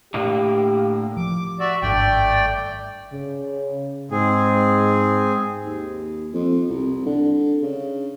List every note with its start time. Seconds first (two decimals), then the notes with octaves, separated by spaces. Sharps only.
0.14 A2 D3 A#3 G4
1.17 F3 D6
1.60 F#4 D5 E5
1.82 G#1 G2 A3 D4 D5 G5
3.12 C#3
4.11 G#2 C4 G#4
5.65 D#2
6.33 F2
6.70 C2
7.06 D3
7.63 C#3